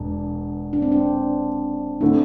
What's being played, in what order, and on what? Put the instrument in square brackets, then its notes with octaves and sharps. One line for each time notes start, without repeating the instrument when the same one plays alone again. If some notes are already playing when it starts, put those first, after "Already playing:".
Already playing: [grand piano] E1 E2 [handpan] D4
[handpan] D4
C4
D4
[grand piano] D3 A3 C4 E4 [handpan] D4